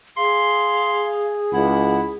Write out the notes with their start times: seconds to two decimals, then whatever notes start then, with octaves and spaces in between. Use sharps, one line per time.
0.17 G#4 F5 C6
1.53 C#2 E4 F#5